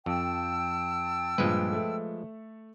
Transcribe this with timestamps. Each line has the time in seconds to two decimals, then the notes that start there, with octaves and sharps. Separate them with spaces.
0.06 F2 G5 A5 E6
1.38 G2 A#2 F3 G#3 B4
1.73 A3 A4